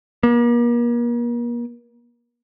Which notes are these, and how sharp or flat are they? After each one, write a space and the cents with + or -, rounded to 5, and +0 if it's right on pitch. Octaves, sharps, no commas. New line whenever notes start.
A#3 +40